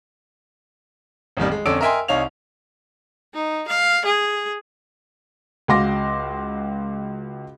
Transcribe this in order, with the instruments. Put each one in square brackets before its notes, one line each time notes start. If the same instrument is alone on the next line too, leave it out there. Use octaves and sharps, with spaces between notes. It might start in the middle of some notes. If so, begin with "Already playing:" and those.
[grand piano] A1 F2 D#3 G3
G#3
F2 D3 C#4 D5 E6 D7
A#4 D#5 E5 G5 G#5 C6
C2 D#4 C#5 F5 F7
[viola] D#4
F5
G#4
[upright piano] C#2 F#4 F5 C6 D6 A#6